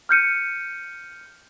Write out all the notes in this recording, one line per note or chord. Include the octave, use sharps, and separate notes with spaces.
F6 G6 C#7 D#7